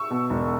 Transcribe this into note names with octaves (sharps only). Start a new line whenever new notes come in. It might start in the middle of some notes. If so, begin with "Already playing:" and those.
Already playing: C#6 E6
B2
E1